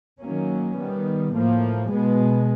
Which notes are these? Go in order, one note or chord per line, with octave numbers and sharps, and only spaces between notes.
D#3 F#3 A#3 C#4
D#3 G3 B3
A2 F3 A#3
B2 G#3 B3